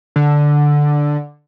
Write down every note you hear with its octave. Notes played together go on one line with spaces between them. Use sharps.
D3